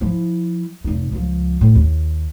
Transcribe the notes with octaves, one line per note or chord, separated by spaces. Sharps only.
F3 E4
F1 D#4
C#2 F3
A2
D#2